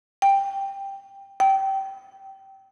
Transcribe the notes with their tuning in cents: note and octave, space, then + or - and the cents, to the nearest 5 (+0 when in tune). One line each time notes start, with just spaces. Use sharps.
G5 +10
G5 -20